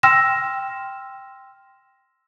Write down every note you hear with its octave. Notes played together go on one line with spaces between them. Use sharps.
G5 C6 E6 F6 A#6 E7